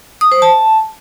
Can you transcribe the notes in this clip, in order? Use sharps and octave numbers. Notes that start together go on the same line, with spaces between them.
D#6
C5
A5